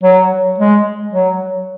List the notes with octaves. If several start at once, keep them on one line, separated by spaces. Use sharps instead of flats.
F#3
G#3
F#3